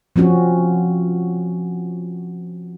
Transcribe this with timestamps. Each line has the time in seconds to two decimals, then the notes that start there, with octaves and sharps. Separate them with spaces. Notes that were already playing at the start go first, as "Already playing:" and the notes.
0.16 F3 C4 C#4 F#4